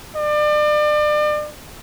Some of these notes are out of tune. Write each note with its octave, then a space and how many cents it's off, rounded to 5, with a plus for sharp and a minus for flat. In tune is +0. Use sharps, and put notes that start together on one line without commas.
D5 +35